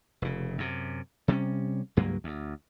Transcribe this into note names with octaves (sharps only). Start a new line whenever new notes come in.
F1 C#3
F#2 C3
C3 G3 B3 C#4
C#2 G2 F#3 A#3
D2